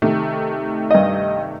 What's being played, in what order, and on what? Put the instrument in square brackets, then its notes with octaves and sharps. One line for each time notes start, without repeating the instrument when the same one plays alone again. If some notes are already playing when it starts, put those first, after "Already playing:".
[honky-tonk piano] C3 D#3 A3
[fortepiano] G2 D#5